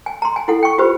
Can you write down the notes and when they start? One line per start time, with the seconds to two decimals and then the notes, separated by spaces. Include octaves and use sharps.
0.06 G#5
0.22 A#5 C6
0.36 G#5
0.48 E4 A4 F#5
0.63 G5 C#6
0.78 F4 G4 B4 C5